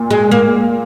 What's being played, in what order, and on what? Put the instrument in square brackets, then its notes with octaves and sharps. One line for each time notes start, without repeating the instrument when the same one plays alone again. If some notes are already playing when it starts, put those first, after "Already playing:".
Already playing: [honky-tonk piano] A#2
[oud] G#3
A#3